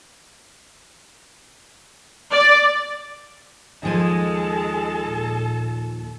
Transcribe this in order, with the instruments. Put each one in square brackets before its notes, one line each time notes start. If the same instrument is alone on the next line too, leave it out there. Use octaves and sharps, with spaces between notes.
[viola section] D5
[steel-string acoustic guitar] D#2 F3 G#5 [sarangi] G#3 [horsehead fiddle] A4 A5
[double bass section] A#2